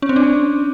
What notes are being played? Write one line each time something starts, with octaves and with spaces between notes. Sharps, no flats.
C#4
C4
D4